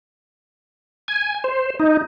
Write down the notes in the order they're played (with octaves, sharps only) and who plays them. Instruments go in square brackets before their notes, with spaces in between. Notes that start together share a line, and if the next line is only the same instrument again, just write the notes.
[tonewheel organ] G#5
C5
D#4